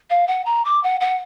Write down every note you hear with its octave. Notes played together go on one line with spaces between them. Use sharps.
F5
F#5
A#5
D6
F#5
F#5